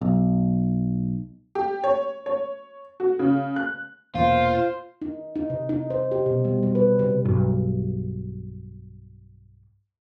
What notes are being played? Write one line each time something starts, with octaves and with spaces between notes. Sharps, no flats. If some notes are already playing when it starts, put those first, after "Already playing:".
B1
G4
C#5
C#5
F#4
C#3
F#6
E1 E2 A#2 F4 C5 F5
D#4
D#4
C3
D#4
C5
G4
B2
G3
G3
B4
C3
B1 G2